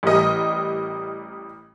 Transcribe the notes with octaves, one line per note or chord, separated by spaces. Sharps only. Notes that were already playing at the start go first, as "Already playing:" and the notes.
A1 G3 A#4 D#5